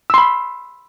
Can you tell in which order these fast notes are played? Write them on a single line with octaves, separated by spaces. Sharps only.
E6 C6 B5